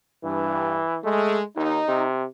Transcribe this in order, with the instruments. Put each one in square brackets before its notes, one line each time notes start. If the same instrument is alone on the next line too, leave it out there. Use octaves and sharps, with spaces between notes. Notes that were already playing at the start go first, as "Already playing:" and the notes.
[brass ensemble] G2 [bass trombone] E3
[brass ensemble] G#3 [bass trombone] A3
[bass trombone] D#2 [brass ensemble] D#4
[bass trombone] C3